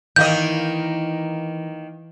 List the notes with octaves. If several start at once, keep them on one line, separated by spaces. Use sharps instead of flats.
D#3 E3 A#3 D#5 G6